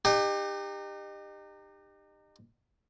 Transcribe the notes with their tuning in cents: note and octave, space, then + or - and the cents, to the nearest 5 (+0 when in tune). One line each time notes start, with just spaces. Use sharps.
D#4 -30 G4 +25